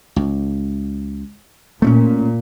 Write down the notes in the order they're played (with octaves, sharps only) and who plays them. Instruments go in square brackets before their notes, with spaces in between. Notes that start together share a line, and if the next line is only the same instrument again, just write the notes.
[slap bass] C#2
[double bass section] A#2 [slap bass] A3 B3 C#4